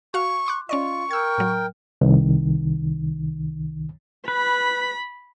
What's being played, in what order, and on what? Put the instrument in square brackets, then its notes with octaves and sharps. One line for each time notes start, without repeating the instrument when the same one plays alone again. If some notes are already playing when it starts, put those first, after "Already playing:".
[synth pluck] F#4 F5 [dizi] C#6
[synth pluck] C6 D6 F#6
[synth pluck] C#4 D5 D#5 [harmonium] F4 [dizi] C#6
[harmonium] A#4 G5 [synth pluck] E6 G#6
[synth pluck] A2 F#3
[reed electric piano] C2 D#3
[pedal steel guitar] B4 [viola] B5